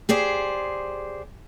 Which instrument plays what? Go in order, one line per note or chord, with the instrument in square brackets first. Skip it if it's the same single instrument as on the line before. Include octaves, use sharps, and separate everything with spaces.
[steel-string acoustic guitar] G4 G#4 C5 D5